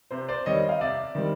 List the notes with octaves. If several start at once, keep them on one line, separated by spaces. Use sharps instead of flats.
C3 C5
C5 D5
D#3 G3 C4 C#5 D#5
F5
C3 D5 E5
D#3 G3 C4